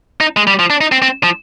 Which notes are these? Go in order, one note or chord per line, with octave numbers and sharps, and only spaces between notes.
D#4
G#3
G3
F3
D4
D#4
C4
C4
F3